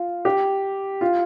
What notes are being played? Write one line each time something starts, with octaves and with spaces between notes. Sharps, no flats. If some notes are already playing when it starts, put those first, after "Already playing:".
Already playing: F4
G4
F4